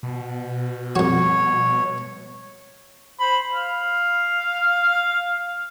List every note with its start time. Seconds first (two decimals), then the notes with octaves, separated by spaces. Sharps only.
0.03 B2
0.96 F2 F3 G3 F#4 C#5
3.20 C5 B5
3.52 F5